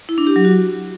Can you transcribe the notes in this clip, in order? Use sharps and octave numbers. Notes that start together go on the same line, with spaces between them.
E4
D4
G4
F#3
F#4